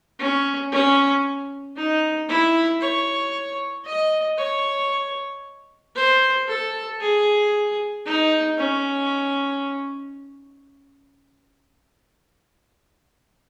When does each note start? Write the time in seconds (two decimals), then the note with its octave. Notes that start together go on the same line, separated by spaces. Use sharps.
0.19 C#4
0.72 C#4
1.76 D#4
2.29 E4
2.81 C#5
3.86 D#5
4.38 C#5
5.96 C5
6.48 A4
7.01 G#4
8.06 D#4
8.58 C#4